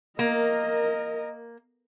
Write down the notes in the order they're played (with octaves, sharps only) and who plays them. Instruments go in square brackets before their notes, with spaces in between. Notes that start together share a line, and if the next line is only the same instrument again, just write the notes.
[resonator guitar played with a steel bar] A#3 [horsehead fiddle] A#4 D#5